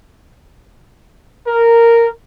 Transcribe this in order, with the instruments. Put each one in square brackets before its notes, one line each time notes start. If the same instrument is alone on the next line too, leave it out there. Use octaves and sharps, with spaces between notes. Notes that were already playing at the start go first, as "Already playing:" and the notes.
[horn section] A#4